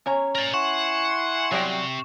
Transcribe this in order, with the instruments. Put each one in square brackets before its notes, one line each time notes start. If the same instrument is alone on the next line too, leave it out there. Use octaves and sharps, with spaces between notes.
[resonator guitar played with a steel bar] C#4 C#5 A#5
[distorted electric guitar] A#4 D5
[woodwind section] E4 G#5 C6 [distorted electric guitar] F#5 [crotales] C#6 E7
[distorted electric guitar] C3 [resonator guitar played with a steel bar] F#3 G3 G5